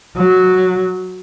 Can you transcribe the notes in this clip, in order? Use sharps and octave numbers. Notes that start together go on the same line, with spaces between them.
F#3